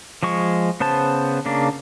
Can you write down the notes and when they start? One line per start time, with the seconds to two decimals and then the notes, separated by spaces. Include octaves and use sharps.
0.23 F3 G#3 C#6
0.80 C#3 B3 C5 A5
1.46 C#3 A#3 D4